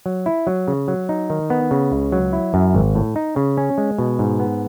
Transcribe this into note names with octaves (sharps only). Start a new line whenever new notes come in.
F#3
E4
F#3
C#3
F#3
D#4
D#3
B3
C#3
C#2
F#3
E4
F#2
G#1
A2
D#4
C#3
C#4
G#3
B2
G#2
B3